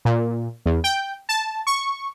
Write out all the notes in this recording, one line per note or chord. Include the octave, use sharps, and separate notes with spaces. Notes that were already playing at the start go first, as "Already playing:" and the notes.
A#2
E2
G5
A5
C#6